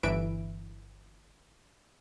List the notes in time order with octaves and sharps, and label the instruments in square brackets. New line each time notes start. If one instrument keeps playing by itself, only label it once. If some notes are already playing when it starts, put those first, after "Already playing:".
[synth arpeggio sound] G1 E3 B4 E5 D7